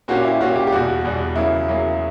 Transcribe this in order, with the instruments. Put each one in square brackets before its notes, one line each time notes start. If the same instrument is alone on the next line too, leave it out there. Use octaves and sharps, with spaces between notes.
[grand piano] A#2 A#3 C#4 G4 [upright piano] F#4
[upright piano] E4
[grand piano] A#2 A#3 C#4 G4 [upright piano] F#4
[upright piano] G4
G4
[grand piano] E2 B2 G3 [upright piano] F#4
[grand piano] E2 B2 G3
[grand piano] E2 C#3 F#3 A#3 [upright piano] E4
[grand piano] E2 C#3 F#3 A#3